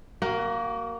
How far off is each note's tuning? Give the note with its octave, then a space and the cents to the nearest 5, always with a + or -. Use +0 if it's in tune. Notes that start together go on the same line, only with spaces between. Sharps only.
A#3 +0 F#4 +30